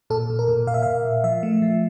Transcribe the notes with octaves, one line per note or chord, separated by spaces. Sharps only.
A#2 A4
A#2
A#4
A#2
A#2 F5
E5
A#2 F5
A#2
F3 E5
A3
F3